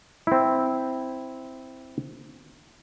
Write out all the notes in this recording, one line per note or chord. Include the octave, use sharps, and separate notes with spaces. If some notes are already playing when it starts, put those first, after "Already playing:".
C4 E4